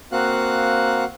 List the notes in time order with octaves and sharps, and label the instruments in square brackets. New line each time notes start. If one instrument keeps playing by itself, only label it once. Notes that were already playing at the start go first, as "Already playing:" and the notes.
[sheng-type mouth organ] A#3 C4 F#4 F5 F#5 F#6